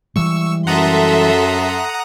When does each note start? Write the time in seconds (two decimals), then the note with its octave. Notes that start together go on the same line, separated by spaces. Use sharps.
0.16 E3 G3 G#3 C#6 E6
0.67 F#2 A4 E5 F#5 A#5 C6 D#6